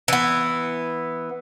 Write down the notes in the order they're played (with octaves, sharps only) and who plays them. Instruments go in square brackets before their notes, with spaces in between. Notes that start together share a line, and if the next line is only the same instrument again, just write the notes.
[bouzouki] E3 B3